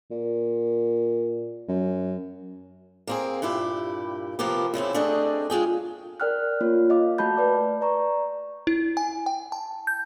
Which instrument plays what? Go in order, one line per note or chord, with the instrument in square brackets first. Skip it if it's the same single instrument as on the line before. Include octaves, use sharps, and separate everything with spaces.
[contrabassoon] A#2
F#2
[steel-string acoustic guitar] A#3 C4 G#4
G2 A#2 E4 G4
C3 F3 A#3 B3 G4
E2 C#3 C4 E4
A3 C4 D4 G4 G#4 D#5
G#3 F4 G#4 G5
[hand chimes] A#4 D5 G5 F6 F#6
A#3 F4 C#5
D#5 F5 D6
A3 F#4 A5 B5 G6
B4 D5 D6
D5 A#5 C#6
[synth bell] E4
G#5
G5
A5
G6